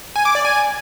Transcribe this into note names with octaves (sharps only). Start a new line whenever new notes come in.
G#5
D6
D5
G#5